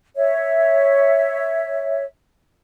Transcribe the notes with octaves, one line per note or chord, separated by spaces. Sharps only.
C#5 E5